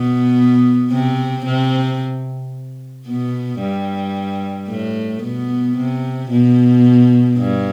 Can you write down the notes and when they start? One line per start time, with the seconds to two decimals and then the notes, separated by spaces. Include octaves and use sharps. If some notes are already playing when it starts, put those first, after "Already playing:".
Already playing: B2 B3
0.91 C3 C4
1.46 C3 C4
3.07 B2 B3
3.61 G2 G3
4.69 A2 A3
5.22 B2 B3
5.77 C3
6.31 B2
7.38 G2